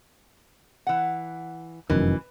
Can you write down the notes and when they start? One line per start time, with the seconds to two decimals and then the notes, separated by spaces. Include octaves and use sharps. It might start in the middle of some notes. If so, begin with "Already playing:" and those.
0.87 E3 F#5
1.90 F1 F#2 D#3 E3